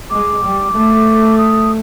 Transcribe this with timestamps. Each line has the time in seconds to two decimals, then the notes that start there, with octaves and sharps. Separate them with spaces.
0.10 G#3 D6
0.43 G3
0.73 A3
1.38 D#6